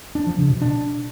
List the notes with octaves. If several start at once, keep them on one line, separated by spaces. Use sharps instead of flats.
D4
F3
C#3
B2
D4